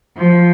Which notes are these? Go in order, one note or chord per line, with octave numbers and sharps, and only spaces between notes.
F3